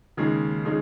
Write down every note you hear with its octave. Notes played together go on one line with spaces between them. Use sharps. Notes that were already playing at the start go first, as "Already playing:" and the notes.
D#2 C#3 G#3 D#4 G#4
C#3 G#3 D#4 G#4